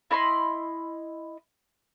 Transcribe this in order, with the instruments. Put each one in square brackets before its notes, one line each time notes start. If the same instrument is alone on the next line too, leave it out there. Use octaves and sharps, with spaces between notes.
[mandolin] E4 D#5 B5 C6